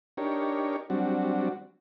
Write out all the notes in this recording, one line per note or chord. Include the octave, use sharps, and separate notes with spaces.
D4 D#4 G4 A#4 C#5
F#3 G3 C4 D4 F#4